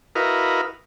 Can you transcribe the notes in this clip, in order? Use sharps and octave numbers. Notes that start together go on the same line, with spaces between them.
E4 F#4 A#4 B4 D#5 F5